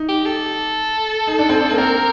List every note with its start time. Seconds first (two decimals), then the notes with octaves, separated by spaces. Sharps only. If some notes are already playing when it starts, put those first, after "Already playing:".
Already playing: D#4
0.09 G4
0.26 A4
1.27 D#4
1.39 D4
1.49 C4
1.61 D4
1.72 A#3
1.77 C4 A#4